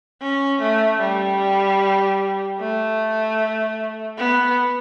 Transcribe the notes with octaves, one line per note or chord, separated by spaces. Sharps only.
C#4
A3
G3
A3
B3